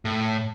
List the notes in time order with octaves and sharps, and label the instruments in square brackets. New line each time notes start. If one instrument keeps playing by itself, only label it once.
[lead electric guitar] A2